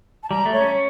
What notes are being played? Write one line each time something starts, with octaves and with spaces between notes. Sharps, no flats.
A5
G3 A#5
A3
C#5
C#4